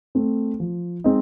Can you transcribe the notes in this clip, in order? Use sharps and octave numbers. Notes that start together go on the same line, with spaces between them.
A3 C4
F3
G#3 C4 D#4